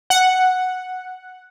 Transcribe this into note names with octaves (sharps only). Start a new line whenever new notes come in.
F#5